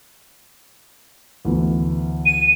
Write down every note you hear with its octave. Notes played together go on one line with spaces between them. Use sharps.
D2 E3 B3
D#7